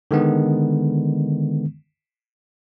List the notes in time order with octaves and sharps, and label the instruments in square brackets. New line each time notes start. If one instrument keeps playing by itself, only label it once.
[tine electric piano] D3 D#3 G#3 B3